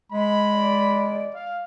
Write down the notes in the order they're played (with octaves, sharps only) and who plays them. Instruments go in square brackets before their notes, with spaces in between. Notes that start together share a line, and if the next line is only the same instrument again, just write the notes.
[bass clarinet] G#3 [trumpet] B5
[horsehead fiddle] D5
[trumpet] F5